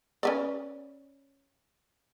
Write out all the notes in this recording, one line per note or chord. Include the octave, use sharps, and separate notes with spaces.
C#4 B4 D5